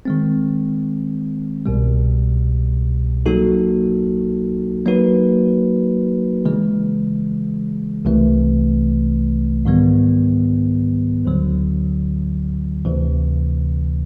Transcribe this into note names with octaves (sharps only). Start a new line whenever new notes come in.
D#3 G#3 C4
C2 B2 G3
F#3 A#3 D#4 F#4 A4
F#3 A#3 D#4 F#4 B4
C#3 E3 G#3
C2 C3 E3 A3
G#2 D#3 G3 B3
D2 D3 F#3
D2 C3 E3